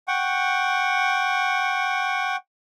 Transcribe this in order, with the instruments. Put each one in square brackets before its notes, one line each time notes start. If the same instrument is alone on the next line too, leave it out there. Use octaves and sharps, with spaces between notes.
[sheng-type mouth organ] F#5 G5 C#6